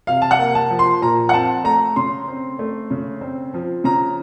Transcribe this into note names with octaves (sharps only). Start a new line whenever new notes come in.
C3 F5
A5
F#5
A#3
A5
F3
C6
A#2 A#5
F#5
C4 A5
A3 A#5
C#3 C6
C4
A3
C#3
C4
F3
C#3 A#5